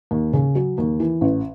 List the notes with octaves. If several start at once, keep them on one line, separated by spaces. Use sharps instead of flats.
D#2
C#3
F#3
D#2
E3
A1